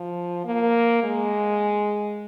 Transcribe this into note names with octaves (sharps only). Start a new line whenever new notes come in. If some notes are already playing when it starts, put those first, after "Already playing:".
Already playing: F3
A#3
G#3